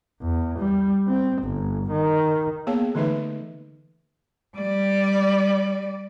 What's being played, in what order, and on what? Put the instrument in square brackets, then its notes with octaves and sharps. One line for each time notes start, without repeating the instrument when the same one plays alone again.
[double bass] E2
G3
C4
G1
D#3
[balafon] A#3 B3 G#4 C#5 F5 A5
D3 E3 A3 D#4 B4 E5
[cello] G3 D5